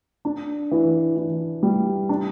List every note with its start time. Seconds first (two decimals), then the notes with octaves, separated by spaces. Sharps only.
0.25 D4
0.71 E3
1.16 E3
1.63 G3
2.09 D4